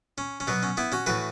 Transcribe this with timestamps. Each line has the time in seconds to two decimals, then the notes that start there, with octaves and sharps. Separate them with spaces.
0.18 C#4
0.40 C#4
0.47 B2 F#3 B3
0.63 C#4
0.77 B3 E4
0.92 C#4 F#4
1.06 A2 E3 F#4 B4